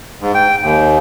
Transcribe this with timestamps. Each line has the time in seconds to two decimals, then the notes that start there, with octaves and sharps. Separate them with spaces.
0.22 G#2
0.34 G5
0.62 D#2